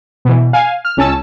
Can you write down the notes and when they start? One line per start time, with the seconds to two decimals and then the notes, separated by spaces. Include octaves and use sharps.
0.25 B2 E3
0.53 F5 G#5
0.85 F6
0.97 C#2 C#4 A5 E6